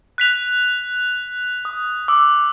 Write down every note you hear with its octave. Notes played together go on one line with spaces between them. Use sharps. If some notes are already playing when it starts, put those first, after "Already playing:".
F#6 B6 F7
D#6
D6 E6